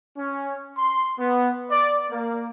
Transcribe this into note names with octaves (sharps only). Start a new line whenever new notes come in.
C#4
C6
B3
D5
A#3